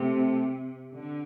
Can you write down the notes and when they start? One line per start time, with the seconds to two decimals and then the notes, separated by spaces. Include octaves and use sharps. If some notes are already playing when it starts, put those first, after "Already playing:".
Already playing: C3 A3 C4 G4
0.93 D3